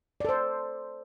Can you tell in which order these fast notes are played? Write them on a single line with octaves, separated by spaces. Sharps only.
D5 A4 C5